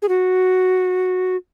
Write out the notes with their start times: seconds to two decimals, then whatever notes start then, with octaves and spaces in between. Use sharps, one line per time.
0.02 G#4
0.09 F#4